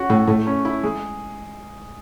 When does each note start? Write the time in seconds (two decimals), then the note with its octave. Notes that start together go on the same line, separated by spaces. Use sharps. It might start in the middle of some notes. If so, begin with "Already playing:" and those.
Already playing: C#4 F#4
0.09 A2 A4
0.28 A2 A3
0.47 C#4
0.65 E4
0.83 G#3